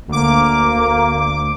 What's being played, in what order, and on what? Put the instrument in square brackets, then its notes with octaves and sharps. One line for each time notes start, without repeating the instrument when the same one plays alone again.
[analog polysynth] D2 D6 [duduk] A#3